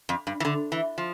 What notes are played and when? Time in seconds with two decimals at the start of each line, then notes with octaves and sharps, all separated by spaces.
0.09 F2
0.27 G2
0.40 E3
0.45 D3
0.72 E3
0.98 F3